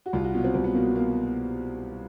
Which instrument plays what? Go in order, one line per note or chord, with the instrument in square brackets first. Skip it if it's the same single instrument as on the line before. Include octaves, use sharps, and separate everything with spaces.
[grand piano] F#4
C2 F4
F#4
B2 F#3 F4
C4
C2 C4
B3
B2 F#3 A#3
A#3